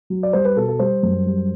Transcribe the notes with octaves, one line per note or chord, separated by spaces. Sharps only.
F#3
D5
G3 C5
B4
B2 A4
A4
G3 C5
F#2
G3